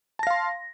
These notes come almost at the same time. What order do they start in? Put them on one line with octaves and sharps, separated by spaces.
A5 A#6 F5 C6